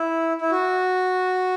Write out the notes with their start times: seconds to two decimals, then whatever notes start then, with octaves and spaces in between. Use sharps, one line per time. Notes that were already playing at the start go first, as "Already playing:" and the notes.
Already playing: E4
0.41 E4
0.51 F#4